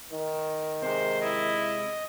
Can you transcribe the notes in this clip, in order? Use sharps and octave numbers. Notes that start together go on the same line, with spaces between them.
D#3
C3 G#3 C5
E4 D#5